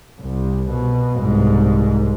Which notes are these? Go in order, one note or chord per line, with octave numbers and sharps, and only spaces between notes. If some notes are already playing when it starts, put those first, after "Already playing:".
C2
B2
C2 G#2